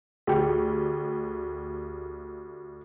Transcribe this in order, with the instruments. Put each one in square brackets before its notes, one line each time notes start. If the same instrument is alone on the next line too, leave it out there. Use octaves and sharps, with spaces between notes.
[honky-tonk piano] D2 G4 [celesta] G#4 G5